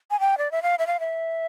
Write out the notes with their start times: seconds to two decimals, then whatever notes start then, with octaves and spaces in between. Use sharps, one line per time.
0.11 G#5
0.20 G5
0.38 D5
0.52 E5
0.63 F5
0.79 E5
0.87 F5
1.00 E5